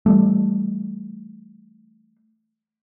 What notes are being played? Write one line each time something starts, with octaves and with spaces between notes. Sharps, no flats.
E3 G3 A3